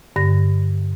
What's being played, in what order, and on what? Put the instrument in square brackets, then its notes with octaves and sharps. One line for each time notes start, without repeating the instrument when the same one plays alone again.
[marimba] G2 D3 A#6